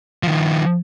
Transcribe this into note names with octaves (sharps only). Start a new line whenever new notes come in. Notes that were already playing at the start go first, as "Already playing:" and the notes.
D#3 F3